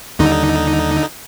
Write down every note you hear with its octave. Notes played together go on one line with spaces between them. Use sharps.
D#2 D3 G3 D#4